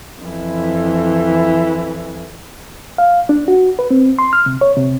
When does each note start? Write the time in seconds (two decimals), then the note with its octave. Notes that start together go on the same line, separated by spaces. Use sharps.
0.21 F2 E3
2.98 F5
3.29 D4
3.48 F#4
3.79 B4
3.91 C4
4.19 C6
4.33 F6
4.46 C3
4.61 C#5
4.77 C3